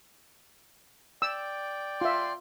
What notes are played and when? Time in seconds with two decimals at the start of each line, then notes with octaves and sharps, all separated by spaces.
1.22 D5 G5 E6
2.01 F4 E5 C6